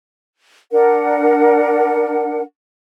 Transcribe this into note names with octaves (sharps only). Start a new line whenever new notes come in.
D4 A#4 F#5